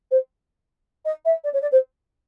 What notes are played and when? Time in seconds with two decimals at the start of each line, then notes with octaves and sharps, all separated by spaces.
0.11 C5
1.05 D#5
1.25 E5
1.44 D5
1.53 C#5
1.62 D5
1.72 C5